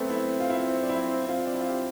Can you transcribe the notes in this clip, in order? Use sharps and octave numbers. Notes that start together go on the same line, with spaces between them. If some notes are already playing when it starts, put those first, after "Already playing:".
Already playing: A3 B3 C4
E4
F4
E4
D4
E4
C4 F4
D4
E4
F4
G4